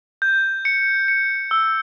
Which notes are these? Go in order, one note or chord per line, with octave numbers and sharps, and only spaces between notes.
G6
C#7
C#7
E6